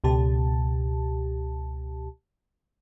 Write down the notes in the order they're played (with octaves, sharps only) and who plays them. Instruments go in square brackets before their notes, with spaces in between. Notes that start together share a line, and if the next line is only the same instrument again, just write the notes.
[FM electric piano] C#2 B2 G4 A5